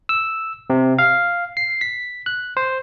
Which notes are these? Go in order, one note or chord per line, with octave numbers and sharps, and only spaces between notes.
E6
C3
F5
C7
B6
F#6
C5